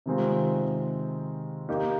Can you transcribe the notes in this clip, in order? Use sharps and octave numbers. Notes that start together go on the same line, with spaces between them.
C3 D#3 G#3 C4 F4
A#3 D#4 G4